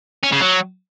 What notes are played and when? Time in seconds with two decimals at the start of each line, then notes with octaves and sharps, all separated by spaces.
0.24 C#4
0.32 C#3
0.41 F#3